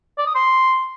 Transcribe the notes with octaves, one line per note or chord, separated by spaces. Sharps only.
D5
D#6
C6